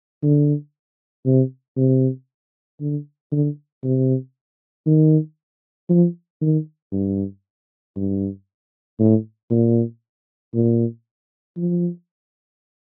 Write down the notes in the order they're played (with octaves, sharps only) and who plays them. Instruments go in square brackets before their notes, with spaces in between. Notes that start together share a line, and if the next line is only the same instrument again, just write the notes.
[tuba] D3
C3
C3
D3
D3
C3
D#3
F3
D#3
G2
G2
A2
A#2
A#2
F3